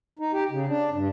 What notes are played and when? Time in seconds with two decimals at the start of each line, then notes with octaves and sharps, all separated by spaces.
0.19 D#4
0.33 G4
0.51 C#3
0.68 D4
0.92 G2